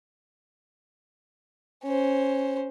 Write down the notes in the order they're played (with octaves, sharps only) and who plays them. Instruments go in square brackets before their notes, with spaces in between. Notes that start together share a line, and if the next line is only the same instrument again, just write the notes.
[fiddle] C#4 C5